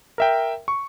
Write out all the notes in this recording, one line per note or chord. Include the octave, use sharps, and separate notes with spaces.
A#4 E5 G5
C#6